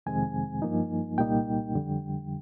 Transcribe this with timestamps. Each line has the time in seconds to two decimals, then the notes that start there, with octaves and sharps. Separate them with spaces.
0.06 F2 C3 D#3 G#3 C4 G#5
0.62 G2 F3 A#3 D#4
1.18 C2 A#2 G3 A#3 D#4 G5
1.73 F2 D3 G3